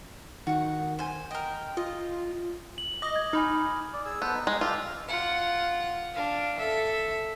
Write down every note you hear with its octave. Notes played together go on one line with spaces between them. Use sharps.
D#3 F#4 F#5
C5 G#5
A#4 D#5 G5
F4 D#5
F#7
D#5 D6 D#6
G#6
D#4 G#5 B5 F6
D5
G#4 E6
B3 A4 C5 F#5
D#4
G#3
F4 G4 A4 B4
F4 F#5
D4 F5
A4 E5